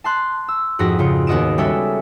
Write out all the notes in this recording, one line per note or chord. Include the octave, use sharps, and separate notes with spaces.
A5 C6 F#6
E6
F2 G#2 D#4 F#4 B4 A#6
C#3 F4 C#7
D#2 B3 F#4 D#5 D7 E7
G3 G#3 C#4 A4 C#5 E5